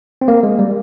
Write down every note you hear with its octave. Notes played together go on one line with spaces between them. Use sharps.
C4
A#3
G#3
G3